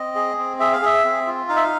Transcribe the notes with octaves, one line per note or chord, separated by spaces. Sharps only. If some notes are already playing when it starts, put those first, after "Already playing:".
Already playing: C4 D#5
G#4
C4
G#4 E5
F5
G#4 E5
C4
F4
D#4 F5
E5
F5